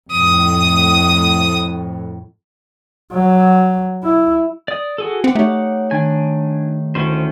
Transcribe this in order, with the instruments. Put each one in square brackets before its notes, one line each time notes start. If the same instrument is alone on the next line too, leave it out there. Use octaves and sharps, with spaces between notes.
[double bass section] F2 A2 [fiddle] D#6
[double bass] F#3
E4
[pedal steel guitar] D5 D#6
F#4 G#4 A4
[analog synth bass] C4 [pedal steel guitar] F#5 D6
[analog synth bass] A3 [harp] D#4 G4 C#5
[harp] D#3 [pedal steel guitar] D4 G#5
[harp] D2 E4 [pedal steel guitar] D#3 C#4 C5